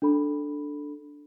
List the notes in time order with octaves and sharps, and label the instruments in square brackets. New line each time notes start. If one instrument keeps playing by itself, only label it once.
[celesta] D4 A4 B5